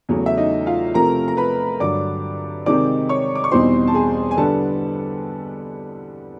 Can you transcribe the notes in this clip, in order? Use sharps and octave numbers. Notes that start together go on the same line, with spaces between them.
E2 C#3 F#3 A3
E5
D#4 D#5
F4 F5
C3 F3 A3 C4 A#4 A#5
A#5
B4 B5
G2 D3 F#3 D5 D6
C3 D#3 G#3 C4 D#4 D5 D6
C#5 C#6
D6
C#6
E2 B2 G3 C4 D#4 C5 C6
A5
G#4 G#5
G#5
D3 G3 B3 D4 A4 A5